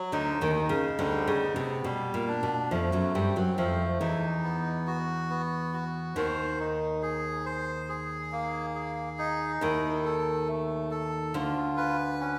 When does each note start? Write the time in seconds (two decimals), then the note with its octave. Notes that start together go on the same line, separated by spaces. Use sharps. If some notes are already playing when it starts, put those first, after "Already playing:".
Already playing: F#3
0.12 D2 D3 D#4
0.41 D#2 D#3
0.55 D#4
0.69 C#3
0.99 D2 D3 G3
1.27 C#3
1.42 B3
1.56 C3
1.84 B2 G3
2.14 A#2
2.28 D4
2.43 B2
2.71 F2 F3 A3
2.92 F#2 F#3
3.15 G2 G3 C4
3.36 F#2 F#3
3.57 F2 F3 A3
4.00 E2 E3 D#4
4.44 B3
4.87 F#4
5.30 B3
5.73 F#4
6.16 D#2 D#3 C5
6.59 D#4
7.03 G#4
7.46 C5
7.89 G#4
8.32 A#3
8.75 G#4
9.19 D#4
9.61 D#2 D#3 E4
10.05 A4
10.48 A3
10.91 A4
11.34 D2 D3 F4
11.77 B4
12.21 C#4